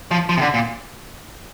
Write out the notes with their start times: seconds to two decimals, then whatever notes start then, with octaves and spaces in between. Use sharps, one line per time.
0.11 F3
0.29 F3
0.37 C3
0.41 D3
0.54 A#2